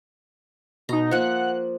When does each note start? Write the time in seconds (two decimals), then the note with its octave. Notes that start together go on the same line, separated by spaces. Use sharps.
0.89 B2 D#4 A#5
1.11 F3 A#3 F#5 F#6